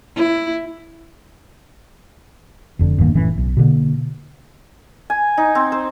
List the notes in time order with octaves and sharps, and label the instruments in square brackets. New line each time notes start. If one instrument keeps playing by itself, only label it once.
[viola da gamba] E4
[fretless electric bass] F1 F2 D3
D#1 G2 D#3 A#3
F#1 A2 E3 C#4
B1
B2 D3 A#3
[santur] G#5
D#4
C4
C5